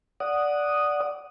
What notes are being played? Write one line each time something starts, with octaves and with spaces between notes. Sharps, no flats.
D5 F#5 D#6